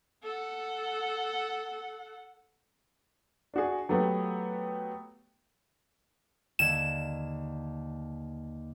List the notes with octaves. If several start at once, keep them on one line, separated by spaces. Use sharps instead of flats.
A4 F#5
D4 F#4 G#4
F#3 A3 B3 G4
D#2 D3 G#6 E7